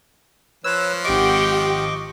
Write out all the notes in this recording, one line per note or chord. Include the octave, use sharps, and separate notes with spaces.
F3 B4 C#5 E6
G#1 G4 D#5 F#5 G5 C#6 D6 D7